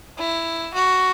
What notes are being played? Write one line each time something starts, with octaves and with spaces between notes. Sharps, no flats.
E4
F#4